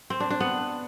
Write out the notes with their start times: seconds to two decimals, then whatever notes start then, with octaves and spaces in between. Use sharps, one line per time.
0.10 C4
0.20 D4
0.30 D4
0.40 B3